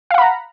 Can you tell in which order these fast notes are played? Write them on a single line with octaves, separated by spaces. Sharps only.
F5 F#5 B5 A#5